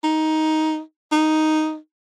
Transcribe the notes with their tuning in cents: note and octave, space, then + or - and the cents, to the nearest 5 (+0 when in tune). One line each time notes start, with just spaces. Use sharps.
D#4 +10
D#4 +0